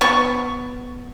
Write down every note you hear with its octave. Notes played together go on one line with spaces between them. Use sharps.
B3 C#6